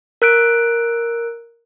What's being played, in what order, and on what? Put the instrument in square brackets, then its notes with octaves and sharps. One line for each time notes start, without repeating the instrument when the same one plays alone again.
[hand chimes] A#4 F#6 D7